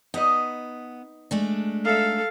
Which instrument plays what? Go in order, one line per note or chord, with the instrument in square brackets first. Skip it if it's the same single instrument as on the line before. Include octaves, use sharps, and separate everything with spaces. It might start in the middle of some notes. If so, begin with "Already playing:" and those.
[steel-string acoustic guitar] B3 [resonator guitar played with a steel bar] D#4 B4 D#5
[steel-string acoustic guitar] G#3 A3 D4
[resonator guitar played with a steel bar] D#4 E5 [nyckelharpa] A4 F5